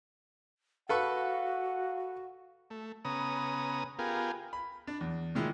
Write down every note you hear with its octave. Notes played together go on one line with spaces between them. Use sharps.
F#4 A4 B4 F5 F#5 C#6
A3
C#3 B3 A#5 D#6
B3 F4 G4 G#4 A#4
B5
D4 D5
E2
A#2 D#3 G#3 E4 G#4